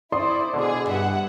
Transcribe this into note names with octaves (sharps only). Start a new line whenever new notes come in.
E4 C5 D5 C6 D#6
B2 D3 D4 G#4
G2 E5 F#5